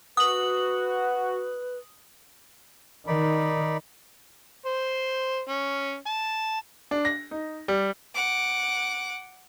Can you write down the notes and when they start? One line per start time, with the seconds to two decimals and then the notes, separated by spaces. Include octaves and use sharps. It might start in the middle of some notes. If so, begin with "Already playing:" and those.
0.17 F#4 B4 D#6 F#7
3.07 D#3 D#4 D5 B5
4.66 C5
5.49 C#4
6.06 A5
6.91 D4
7.05 A#6
7.31 D#4
7.68 G3
8.16 F#5 D6